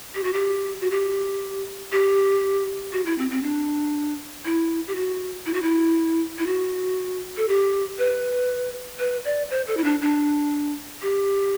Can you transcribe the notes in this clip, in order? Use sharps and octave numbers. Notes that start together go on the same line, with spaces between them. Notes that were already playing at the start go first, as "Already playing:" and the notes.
G4
F#4
G4
F#4
G4
G4
F#4
E4
C4
C4
D4
E4
G4
F#4
E4
F#4
E4
E4
F#4
A4
G4
B4
B4
D5
C5
A4
E4
D4
D4
G4